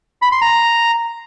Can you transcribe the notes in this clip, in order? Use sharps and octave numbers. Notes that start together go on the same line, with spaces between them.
B5
C6
A#5